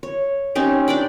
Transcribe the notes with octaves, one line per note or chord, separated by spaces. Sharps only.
C#5
C4 C#4 D#4 G4
D4 D5 G5 B5